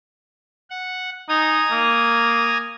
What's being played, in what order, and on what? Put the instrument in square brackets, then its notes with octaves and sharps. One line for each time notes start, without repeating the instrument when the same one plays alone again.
[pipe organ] F#5
[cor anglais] D#4 [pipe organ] G#5 A#5 D#6
[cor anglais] A#3